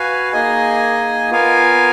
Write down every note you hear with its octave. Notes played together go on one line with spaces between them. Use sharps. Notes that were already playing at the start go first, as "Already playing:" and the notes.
Already playing: F#4 B4 F5 G#5
A#3 D#4 G#4 D#5 G#5
B3 F4 A#4 F5 G#5